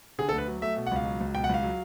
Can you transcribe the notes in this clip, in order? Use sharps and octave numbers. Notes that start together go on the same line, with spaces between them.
D3 G#4
A4
D2 B4
F#3
A3 E5
B2
F#5
C#2 F5
F#3
C#2
B2 G5
F#5
C#2 F5
F#3